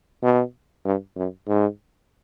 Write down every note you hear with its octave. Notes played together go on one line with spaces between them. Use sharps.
B2
G2
F#2
G#2